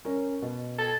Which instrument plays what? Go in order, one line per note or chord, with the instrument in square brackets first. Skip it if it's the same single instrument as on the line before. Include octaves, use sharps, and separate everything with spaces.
[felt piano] C#4 A#4
B2
[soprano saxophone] A4